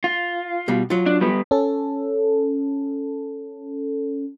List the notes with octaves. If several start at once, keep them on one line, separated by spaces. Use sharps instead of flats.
F4
B2 G3
F#3 F4
D4
G3 B3
C#4 A4